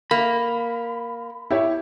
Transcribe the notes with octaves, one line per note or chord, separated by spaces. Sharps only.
A#3 B5
E4 G4 C#5